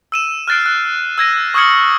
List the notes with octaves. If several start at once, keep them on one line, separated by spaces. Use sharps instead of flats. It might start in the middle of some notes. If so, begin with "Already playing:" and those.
E6 D#7 E7
F6 F#6 A6 C7 D7
F#6
E6 G#6 A#6 D#7
C#6 D#6 F6 G#6 C#7 F#7